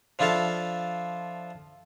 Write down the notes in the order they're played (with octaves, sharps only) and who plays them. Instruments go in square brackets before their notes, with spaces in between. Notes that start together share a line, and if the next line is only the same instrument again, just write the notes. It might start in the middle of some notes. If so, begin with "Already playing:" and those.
[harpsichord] F3 D4 E4 F4 A4 F5